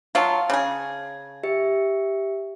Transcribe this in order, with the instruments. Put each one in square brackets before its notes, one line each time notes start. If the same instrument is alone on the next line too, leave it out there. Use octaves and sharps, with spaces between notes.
[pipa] F#3 F4 [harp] F5 A5
[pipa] C#3 G#4
[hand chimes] G4 E5 C#7